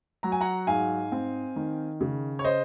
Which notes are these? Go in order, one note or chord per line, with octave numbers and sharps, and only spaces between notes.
F#3 A#5
G#5
F#5 A#5
G#2 F5 G#5
C4
D#3
C#3
C#5
C5 D#5